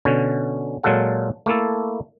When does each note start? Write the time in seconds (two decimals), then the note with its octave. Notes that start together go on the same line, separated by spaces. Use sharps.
0.05 B2 D3 C#4
0.83 A#2 F#3 G#3 F4 A4 F#5
1.46 A3 A#3 E4 A4